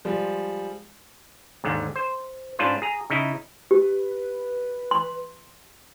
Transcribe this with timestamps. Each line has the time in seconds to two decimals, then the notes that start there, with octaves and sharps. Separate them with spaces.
0.05 F3 G3 G#3
1.64 D#2 G#2 D3
1.96 C5
2.59 G#2 C#4 D4 F4 B4 C5
2.82 G#4 A#5
3.10 C#3 D#4 E4
3.71 G4 B4
4.91 C6